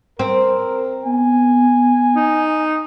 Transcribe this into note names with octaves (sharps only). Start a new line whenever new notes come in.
C4 A#4
B3 G#5
D#4